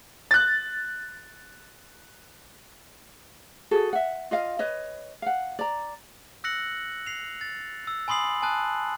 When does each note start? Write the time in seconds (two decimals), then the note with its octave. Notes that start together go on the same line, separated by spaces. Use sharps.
0.31 F#6 A6
3.71 F#4 G#4 A4
3.93 E5 F#5
4.31 F4 D#5 F5
4.59 B4 C#5 D#5
5.22 F5 F#5
5.59 D5 A#5
6.44 E6 F#6 A#6 C#7 F#7
7.07 C7 F7
7.41 A6
7.87 E6
8.08 G#5 B5 C6 D#6 C7 F#7
8.42 G#5 A5 D#6 F#6